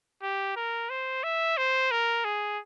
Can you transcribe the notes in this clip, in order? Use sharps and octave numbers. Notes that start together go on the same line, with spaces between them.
G4
A#4
C5
E5
C5
A#4
G#4